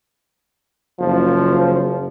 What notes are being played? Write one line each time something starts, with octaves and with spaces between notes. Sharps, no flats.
F#1 F3